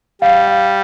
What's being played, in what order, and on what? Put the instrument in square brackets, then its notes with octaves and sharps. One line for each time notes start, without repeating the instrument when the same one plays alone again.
[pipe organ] G3 [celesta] F5
[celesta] F5